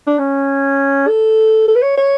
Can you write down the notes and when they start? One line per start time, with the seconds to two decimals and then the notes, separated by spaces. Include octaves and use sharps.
0.07 D4
0.19 C#4
1.08 A4
1.68 A4
1.76 B4
1.82 C#5
1.97 C#5